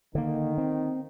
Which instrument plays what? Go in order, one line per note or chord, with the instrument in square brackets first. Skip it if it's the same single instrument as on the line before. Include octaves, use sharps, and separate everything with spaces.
[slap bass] D3 A#3 [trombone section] D#3 D#4
[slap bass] C4